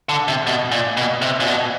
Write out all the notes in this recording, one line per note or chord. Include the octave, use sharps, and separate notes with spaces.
D3
C3
B2
A#2
B2
C3
A#2
B2